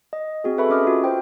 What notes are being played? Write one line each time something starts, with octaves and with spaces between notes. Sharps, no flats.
D#5
C4 F#4 G#4
G#4 A4 B4 E5 B5 C#6
C#4 F#4 D#5 D6 D#6 F6
F4 F#4
F#4 C5 G5